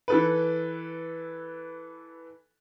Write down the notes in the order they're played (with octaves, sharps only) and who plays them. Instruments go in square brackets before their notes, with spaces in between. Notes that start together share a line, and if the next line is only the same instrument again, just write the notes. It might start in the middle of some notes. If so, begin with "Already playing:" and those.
[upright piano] E3 A4 B4